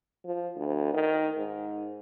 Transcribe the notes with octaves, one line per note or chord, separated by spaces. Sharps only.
F3
D2
D#3
G#2